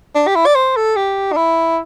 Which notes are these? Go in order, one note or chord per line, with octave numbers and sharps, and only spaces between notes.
D4
G4
E4
D5
C5
A4
G4
D4
E4